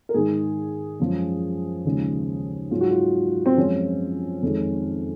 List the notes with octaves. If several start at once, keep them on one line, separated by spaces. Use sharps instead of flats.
A#4
G#2 D#3 G#3 G#4
F#2 F3 G#3
D#2 C#3 F3 G#3
G#2 F#3 F4
F#4
F4
C4
F#2 F3 G#3 C#4
F2 D#3 G#3